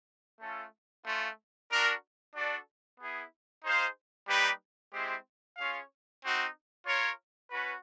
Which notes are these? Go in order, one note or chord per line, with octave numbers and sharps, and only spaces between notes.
A3 C#4 F4 A4
A3 C#4 F4
D4 F#4 A#4
D4 F#4 A4 D5
B3 E4 G#4
D#4 G#4 C5 F5
G3 A#3 D#4 G4 B4
G#3 C4 E4 G4 C5
C#4 F4 G#4 C#5 F5
C4 D#4 F#4
F4 A#4 C#5
C#4 F#4 B4